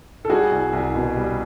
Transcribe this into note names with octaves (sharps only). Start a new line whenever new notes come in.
A4
G3 F#4 G#4
C2
C2
B2
G3